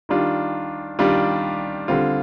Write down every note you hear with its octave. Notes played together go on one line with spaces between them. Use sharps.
D#3 G3 D4 F4
D#3 G3 D4 F4
D3 G3 C4 F4